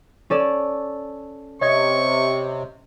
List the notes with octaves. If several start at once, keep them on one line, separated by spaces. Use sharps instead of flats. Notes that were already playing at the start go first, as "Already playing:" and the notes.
C#4 A4 D5
C3 C#5 D#5 C#6 G#6